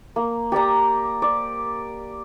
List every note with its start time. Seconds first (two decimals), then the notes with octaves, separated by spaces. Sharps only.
0.16 A#3
0.52 G4 D5 G5 A#5
1.22 D5